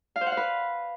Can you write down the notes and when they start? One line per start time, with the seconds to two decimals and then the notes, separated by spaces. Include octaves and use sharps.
0.16 F5
0.21 C5
0.26 F#5
0.32 F5
0.37 B4